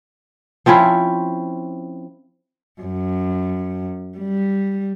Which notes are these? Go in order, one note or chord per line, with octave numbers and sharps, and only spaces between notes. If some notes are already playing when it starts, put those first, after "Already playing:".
F3 C4 C#4 E4
F#2
G3